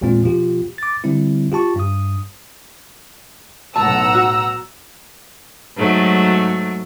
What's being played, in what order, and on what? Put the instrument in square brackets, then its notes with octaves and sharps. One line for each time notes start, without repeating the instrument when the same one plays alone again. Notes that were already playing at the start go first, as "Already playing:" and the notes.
[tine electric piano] A1 E2 A#2 G#3 C4 F4
B2 F3 F4 G4
D6 A6
D3 G3 C4 E4
F4 G4 A5 C#6
G2 D#6
[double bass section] B1 A2 [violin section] F#5 A#5 E6 [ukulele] A5
[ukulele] F#4
[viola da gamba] G#2 F#3 A3